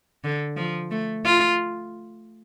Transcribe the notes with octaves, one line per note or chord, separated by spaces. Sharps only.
D3
F3
A3
F4